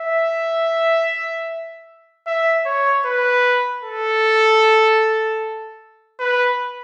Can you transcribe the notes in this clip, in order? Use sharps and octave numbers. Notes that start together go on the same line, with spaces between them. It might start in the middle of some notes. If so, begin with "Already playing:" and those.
Already playing: E5
E5
C#5
B4
A4
B4